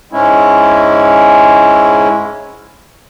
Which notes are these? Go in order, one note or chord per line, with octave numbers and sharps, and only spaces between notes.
G#2 G#3 C#4 E4